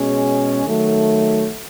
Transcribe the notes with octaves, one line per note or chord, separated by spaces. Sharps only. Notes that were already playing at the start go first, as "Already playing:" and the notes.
Already playing: B2 G#3 C#4 G#4
D#3 F#3 A3